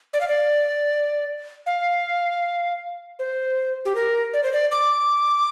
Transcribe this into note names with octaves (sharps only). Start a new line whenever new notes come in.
D5
F5
D5
F5
C5
G4
A#4
D5
C5
D5
D6